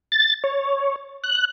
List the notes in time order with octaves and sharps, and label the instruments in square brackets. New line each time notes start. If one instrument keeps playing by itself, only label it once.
[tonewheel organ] A6
C#5
F#6